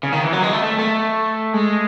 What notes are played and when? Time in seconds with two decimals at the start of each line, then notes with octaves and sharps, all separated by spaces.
0.03 C#3
0.12 D#3
0.24 E3
0.33 F#3
0.43 G#3
0.53 A3
0.63 A3
0.79 A3
1.54 G#3